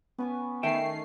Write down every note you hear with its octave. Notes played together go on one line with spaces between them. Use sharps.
B3 C#4 G#5 D6
D#3 A3 E5 G5 C7